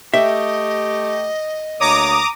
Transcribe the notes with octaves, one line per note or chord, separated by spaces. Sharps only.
A3 G4 D#5 E5
D2 A#3 C#5 A#5 D6 D#6